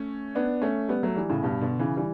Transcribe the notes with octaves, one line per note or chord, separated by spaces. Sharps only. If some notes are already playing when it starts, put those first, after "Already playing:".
Already playing: A3 C#4
B3 D4
A3 C#4
G3 B3
F#3 A3
E3 G3
A2 C#3
G2 B2
B2 D3
C#3 E3
E3 G3